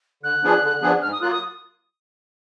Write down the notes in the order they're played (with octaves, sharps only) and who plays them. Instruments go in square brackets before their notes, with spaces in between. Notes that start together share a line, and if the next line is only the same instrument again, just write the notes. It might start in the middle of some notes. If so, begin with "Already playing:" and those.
[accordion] D3 [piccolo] F#6
[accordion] F3 B3 D4 G#4
D3
F3 B3 D4 G#4
[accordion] G#2 [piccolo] F6
[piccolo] D#6
[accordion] F#3 A#3 F4 [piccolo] F#6
[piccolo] D#6